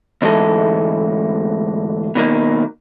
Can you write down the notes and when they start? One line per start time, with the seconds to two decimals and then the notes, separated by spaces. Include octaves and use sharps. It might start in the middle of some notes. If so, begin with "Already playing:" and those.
0.22 D2 G#2 E3 G#3 A4
2.15 B2 D#3 A#3